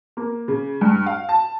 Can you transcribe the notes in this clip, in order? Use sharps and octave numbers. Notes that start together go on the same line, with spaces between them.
A#3
C#3
G2
F5
A5